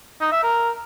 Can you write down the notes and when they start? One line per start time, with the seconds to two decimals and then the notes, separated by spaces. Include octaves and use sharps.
0.21 D#4
0.32 E5
0.43 A#4